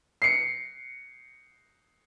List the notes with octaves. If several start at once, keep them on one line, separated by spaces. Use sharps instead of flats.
C7 C#7